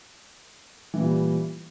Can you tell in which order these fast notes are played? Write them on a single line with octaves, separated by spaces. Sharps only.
E3 A#2 G3